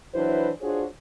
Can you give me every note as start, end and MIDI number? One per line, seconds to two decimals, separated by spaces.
0.14 0.50 52
0.14 0.50 54
0.14 0.50 62
0.14 0.50 64
0.14 0.50 71
0.14 0.50 72
0.62 0.84 62
0.62 0.84 65
0.62 0.84 66
0.62 0.84 68
0.62 0.84 72
0.62 0.84 73